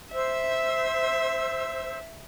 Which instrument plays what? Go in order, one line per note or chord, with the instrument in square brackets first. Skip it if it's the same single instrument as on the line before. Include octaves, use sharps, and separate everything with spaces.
[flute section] C5 E6 [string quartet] E5